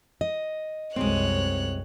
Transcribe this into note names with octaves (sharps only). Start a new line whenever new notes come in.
D#5
C2 F#2 G#3 C4 C#5 F#6